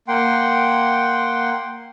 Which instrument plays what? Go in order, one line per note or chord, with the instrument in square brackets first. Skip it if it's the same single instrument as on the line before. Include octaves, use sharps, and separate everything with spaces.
[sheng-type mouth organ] A#3 F#5 G5 C6